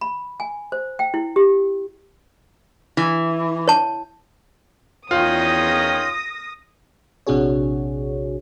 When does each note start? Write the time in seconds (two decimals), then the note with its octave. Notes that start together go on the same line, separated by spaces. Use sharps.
0.01 B5
0.40 G#5
0.72 C5
0.99 G5
1.14 E4
1.36 G4
2.97 E3
3.68 C#5 A5
5.11 E2 D#3 C#4 F4 G5 D#6 A#6
7.27 A#1 C3 D4 F#4 G#4 C#5